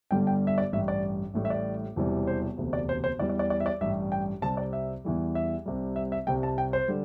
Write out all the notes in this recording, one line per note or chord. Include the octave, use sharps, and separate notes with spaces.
G1 G2 D3 G3 G5
G5
E5
D5
A1 G2 G3 E5
D5
A1 A2 G3
E5
D5
E1 E2 C3 E3 G3
C5
E1 D2 C3
D5
C5
C5
E2 E3 G3 D5
D5
D5
D5
E5
D5
A1 G2 G3 E5
G5
C2 C3 G3 A5
D5
E5
E2 E3 G3
E5
C2 C3 G3
E5
E5
C2 C3 G3 G5
A5
G5
C5
D3 G3